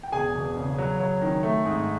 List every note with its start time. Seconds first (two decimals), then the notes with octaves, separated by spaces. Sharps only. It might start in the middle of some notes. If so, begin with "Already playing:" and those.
0.03 G5
0.12 E1 G#4 G#5
0.35 E1
0.57 C#3
0.78 F#3
1.00 F#3
1.21 D#3
1.43 A3
1.65 G#2